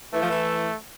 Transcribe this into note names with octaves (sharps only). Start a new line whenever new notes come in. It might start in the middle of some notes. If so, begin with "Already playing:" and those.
E3 A3
F3
E3